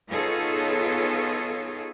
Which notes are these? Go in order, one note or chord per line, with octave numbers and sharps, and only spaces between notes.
B3 D#4 F4 G#4 A4 C#5